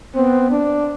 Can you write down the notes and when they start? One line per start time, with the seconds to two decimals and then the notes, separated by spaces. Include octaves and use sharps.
0.14 B3 C4
0.50 D4